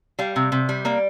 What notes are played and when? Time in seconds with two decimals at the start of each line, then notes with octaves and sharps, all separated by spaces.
0.19 G3 F5
0.36 C3
0.52 C3
0.69 G3
0.85 A#3 D5